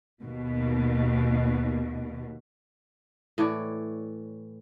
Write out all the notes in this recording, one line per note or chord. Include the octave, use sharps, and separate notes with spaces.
D#2 B2
A2 E3 C#5 D5